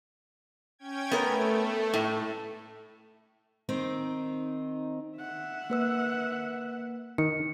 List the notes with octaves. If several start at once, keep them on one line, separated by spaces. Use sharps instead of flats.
C#4 G5 G#6
A3 B3 A#4
A2
D#3 C4 D#4
E5 F#5
A#3 B4 E6
D#3 C#7